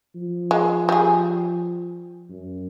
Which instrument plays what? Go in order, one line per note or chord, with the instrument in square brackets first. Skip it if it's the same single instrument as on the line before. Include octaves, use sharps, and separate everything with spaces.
[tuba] F3
[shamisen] G#3
G3 G#4
[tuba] F#2